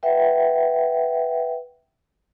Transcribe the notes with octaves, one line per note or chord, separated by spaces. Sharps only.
B4 E5 F#5 G5